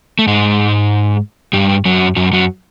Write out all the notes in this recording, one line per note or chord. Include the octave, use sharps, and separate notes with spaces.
A3
G#2 G#3
G2 G3
F#2 F#3
F#2 F#3
F#2 F#3